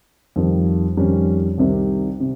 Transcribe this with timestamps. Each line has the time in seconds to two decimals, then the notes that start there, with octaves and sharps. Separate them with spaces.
0.36 F2 D#3 G3
0.97 F2 D#3 G3 C#4
1.58 C2 C3 D#3 G3
2.20 C3